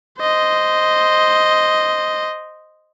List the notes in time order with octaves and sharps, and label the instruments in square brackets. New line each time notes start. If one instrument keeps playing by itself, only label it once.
[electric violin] C5 D#5